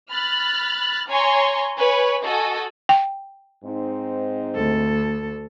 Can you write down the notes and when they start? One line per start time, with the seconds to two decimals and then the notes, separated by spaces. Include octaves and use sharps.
0.11 B5 F6 F#6 A6
1.09 C#5 G#5 A#5 C6 C#6
1.77 B4 C#5 G#5
2.24 F#4 A4 D#5 G#5
2.89 G5
3.64 G#2 C4 D#4
4.54 D2 A4